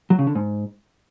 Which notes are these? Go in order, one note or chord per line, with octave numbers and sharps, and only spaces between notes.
F#3
C#3
D3
G#2